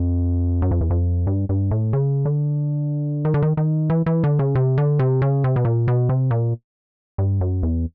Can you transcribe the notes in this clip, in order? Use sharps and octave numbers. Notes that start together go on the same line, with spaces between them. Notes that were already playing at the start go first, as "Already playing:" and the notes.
Already playing: F2
F#2
F2
E2
F2
G2
G2
A2
C#3
D3
D#3
D3
D#3
D#3
E3
E3
D3
C#3
C3
D3
C3
C#3
C3
B2
A#2
B2
C3
A#2
G2
F#2
E2